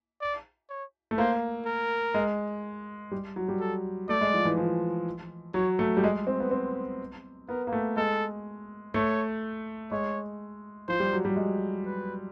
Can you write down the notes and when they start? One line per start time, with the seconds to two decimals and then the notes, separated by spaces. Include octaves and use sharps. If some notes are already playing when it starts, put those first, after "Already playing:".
0.21 D5
0.69 C#5
1.11 A3
1.18 A#3 C5
1.66 A#4
2.14 G#3
3.12 G3
3.36 F#3
3.48 G3
3.60 A4
4.09 A3 D5
4.21 G#3
4.34 F3
4.45 E3
4.57 F3
5.54 F#3 C#5
5.79 A3
5.97 G3
6.04 G#3
6.27 C4
6.40 B3
6.51 C4
7.49 B3 A#4
7.67 A#3
7.73 A3
7.97 G#3 A4
8.94 A3 C#5
9.91 G#3 C#5
10.88 F3 C5
11.00 G3
11.13 F#3
11.25 G3
11.36 G#3
11.86 B4